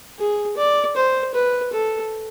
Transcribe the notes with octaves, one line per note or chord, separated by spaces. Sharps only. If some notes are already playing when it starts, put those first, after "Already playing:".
G#4
D5
C5
B4
A4